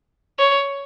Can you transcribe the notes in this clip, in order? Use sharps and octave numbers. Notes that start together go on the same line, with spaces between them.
C#5